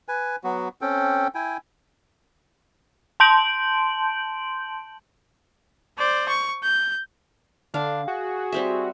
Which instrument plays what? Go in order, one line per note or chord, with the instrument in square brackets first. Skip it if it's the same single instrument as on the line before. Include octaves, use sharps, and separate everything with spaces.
[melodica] B4 G#5
F#3 B3 F#4
C4 C#4 A4 G5
E4 G5 G#5
[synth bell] A5 C6 G6 D7 F#7
[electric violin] C5 D5
C#6
G6
[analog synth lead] D3 [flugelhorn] D4 [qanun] F5
[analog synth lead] F#4 [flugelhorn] G#4
[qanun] G3 C4 E5